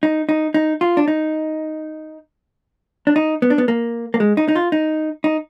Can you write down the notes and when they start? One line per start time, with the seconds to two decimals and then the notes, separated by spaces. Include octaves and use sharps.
0.03 D#4
0.29 D#4
0.54 D#4
0.81 F4
0.97 D4
1.08 D#4
3.07 D4
3.16 D#4
3.42 B3
3.50 D4
3.58 B3
3.68 A#3
4.14 A#3
4.20 G#3
4.37 D#4
4.48 D#4
4.56 F4
4.72 D#4
5.24 D#4